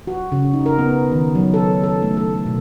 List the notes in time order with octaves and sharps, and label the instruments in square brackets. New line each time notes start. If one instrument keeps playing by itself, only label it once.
[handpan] F#4
C#3
D#4
A#4
B3
D#3
F#3
A4
A4
A3
A4
B2